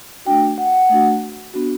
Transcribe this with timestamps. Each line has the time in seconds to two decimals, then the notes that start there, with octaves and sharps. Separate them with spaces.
0.25 A3 D4 F#4 G5
0.58 F#5
0.89 A3 D4 F#4
1.54 B3 D4 F#4